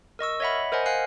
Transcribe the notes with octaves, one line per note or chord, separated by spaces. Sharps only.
A#4 D#5 C#6 E6
C#5 D#5 E5 F#5 B5
A#4 C5 D#5 F#5 G#5
F5 G#5 F#6 C7